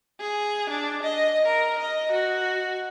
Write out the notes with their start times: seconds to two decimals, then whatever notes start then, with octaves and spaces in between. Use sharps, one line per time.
0.20 G#4
0.69 D4
1.03 D#5
1.46 A#4
1.79 D#5
2.11 F#4